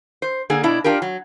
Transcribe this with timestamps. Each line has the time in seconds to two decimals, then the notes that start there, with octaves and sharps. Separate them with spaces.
0.22 C5
0.50 D3 A#3 G#4
0.63 B2 D4 E4
0.84 D4 F4 G4 A#4
1.02 F#3